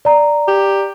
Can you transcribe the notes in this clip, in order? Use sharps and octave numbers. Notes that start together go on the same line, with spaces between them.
D5 A#5
G4